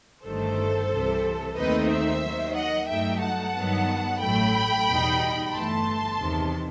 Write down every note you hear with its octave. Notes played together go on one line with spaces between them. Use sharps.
G1 G2 D#3 A3 A4 C5
C2 C3 E3
D#2 D#3 A3 C4 D#4 B4 D#5
C5 E5
D#2 D#3 F#3
D#5 F#5
G2 F#3 A3 D#4 E5 G5
F#5 A5
G2 D#3 F#3 B3
A1 A2 F#3 A3 G5 B5
E2 B2 G3 D#4
G1 G2 E3 A3 A5 C6
E2 C3 D#3